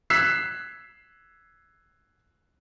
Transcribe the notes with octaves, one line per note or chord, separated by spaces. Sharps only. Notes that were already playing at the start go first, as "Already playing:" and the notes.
E6 F#6 G#6 B6 C7 E7